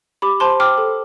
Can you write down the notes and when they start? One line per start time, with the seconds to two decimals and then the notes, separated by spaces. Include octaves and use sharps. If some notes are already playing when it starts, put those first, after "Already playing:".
0.22 G4 B5 D6
0.40 C5 A5 C6
0.60 G5 D6 F6
0.78 A4